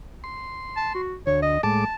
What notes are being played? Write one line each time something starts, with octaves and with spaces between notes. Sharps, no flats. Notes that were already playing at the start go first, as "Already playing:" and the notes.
C6
A5
F#4
D2 C#5
D#5
A2 G#3 A5 D6